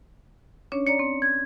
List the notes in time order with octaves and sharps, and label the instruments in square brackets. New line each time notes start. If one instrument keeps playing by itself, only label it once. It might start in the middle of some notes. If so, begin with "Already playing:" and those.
[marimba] C#4 D4 C#5
[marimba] C#5 D5 A#5 [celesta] C#7
[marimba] C4
[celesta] G#6